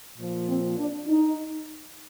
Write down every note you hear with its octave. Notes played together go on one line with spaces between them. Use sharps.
A#2 F3
C4
D4
D#4